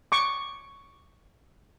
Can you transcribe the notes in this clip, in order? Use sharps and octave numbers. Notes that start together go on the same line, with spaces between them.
C#6 D6